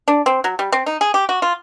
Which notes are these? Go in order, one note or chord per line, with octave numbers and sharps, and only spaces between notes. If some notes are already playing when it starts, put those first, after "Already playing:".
D4
C4
F#3
G3
C4
D#4
G#4
G4
F#4
F4